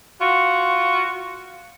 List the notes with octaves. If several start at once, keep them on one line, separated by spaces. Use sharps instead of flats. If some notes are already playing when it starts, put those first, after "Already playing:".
F4 F#4